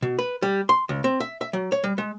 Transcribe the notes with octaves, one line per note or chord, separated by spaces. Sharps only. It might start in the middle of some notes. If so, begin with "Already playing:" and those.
B2
B4
G3
C6
C#2
C4
E5
E5
F#3
C#5
G3
G#3